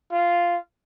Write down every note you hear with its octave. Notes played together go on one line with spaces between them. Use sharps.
F4